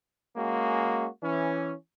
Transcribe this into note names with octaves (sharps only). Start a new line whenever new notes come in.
G#3 A#3 C#4 F#4
E3 C#4